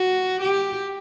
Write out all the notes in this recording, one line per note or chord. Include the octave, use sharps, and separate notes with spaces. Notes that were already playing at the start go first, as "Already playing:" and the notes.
Already playing: F#4
G4